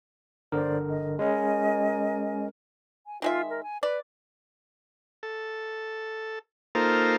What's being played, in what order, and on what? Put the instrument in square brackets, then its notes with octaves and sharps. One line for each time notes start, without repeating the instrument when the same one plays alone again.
[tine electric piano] G1 D3 A#4 [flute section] C5 D5
[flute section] D#5
[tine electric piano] G#3 C#4 [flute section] A#4 D#5 G#5
[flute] G#5
[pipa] D#3 G#3 E5 [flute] F4
[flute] A#4
G#5
[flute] B4 [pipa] D5
[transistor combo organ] A4
A#3 D#4 F4 A4 A#4 C5